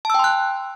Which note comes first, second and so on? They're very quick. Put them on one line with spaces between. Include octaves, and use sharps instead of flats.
A5 E6 G5 C6 F#6